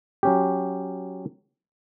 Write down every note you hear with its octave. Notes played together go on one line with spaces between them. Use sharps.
F#3 C#4 G4